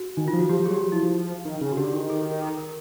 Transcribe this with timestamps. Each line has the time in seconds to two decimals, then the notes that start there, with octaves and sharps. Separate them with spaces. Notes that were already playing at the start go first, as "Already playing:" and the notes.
Already playing: F#4
0.17 D#3 D#4
0.28 F4
0.33 F3
0.39 F#4
0.49 F3 G4
0.60 F3
0.66 G#4
0.70 F#3
0.74 G4
0.81 F#4
0.92 F3 E4
1.03 F3
1.45 D#3
1.61 C#3
1.72 F#4
1.77 D3 G4
1.93 D#3 G#4
2.10 A4
2.31 A#4
2.42 A4
2.57 A#4